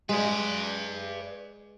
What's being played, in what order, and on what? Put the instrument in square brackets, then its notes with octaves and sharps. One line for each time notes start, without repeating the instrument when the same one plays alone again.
[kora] G#3 [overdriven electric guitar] B4 D5